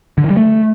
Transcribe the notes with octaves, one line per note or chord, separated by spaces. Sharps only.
D3
E3
G3
A3